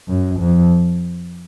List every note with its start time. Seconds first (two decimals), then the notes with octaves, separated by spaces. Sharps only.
0.08 F#2
0.40 F2